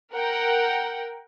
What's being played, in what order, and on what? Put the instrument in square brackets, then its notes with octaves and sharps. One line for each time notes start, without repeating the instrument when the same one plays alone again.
[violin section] A#4 F#5 G5